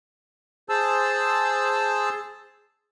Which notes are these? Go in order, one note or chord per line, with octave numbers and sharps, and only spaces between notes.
G#4 C5 A5 E6